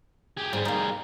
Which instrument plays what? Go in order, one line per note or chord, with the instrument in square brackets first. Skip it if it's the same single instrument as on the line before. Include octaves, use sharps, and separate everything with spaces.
[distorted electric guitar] G4 G#4
[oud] G#2 [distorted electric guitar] G3 G#4
[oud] A#3 D#4